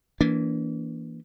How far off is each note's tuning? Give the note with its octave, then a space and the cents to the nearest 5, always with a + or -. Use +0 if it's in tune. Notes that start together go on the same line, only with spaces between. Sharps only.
E3 +0 A#3 +0 D4 -35